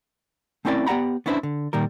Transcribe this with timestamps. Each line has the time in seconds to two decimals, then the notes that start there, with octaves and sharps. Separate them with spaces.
0.65 A3 C4 C#4 E4 A#4 D5
0.87 B3 G4 D5 F#5 A#5 B5
1.26 B3 C#4 D4 E4 B4 C5
1.43 D3
1.73 A#2 D#3 G3 A#4